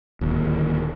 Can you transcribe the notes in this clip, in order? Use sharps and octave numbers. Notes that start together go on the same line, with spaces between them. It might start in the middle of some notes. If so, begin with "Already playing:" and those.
D1 D#2